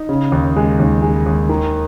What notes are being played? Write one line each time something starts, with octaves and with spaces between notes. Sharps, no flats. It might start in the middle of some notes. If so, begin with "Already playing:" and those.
Already playing: D#4
C#3
D#2
G#3
D#2
G#3
D#2
D#3